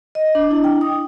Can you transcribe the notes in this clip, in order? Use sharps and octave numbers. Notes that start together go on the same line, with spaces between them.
D#5
D4
E4
G5
D#6